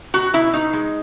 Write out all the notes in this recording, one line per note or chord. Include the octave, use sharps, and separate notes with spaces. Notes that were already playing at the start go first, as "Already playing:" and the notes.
B2 F#4
B2 E4
B2 D#4
G#3